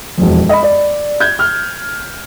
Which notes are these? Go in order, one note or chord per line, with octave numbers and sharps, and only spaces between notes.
E1 F2
D#5 B5
D5
G6 G#6
F6